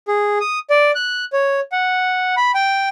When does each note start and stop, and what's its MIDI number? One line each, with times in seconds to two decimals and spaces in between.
0.08 0.38 68
0.40 0.59 87
0.70 0.91 74
0.95 1.25 90
1.33 1.60 73
1.72 2.35 78
2.37 2.51 83
2.54 2.89 79